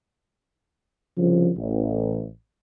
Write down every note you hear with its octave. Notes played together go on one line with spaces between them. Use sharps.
C2 C#3 F3
A1